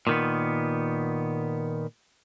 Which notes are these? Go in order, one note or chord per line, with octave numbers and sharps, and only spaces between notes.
A#2 D#3 B3